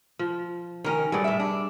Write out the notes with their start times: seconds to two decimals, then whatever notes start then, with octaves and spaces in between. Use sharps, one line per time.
0.19 F3
0.84 D#3 C#4 A#4 C#5
1.12 G2 F#3 A3 G#4 D5
1.24 A2 E5
1.40 D4